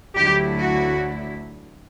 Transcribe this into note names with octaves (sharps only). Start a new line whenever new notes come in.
D2 D3 F#3 A3 E4 G4
F#4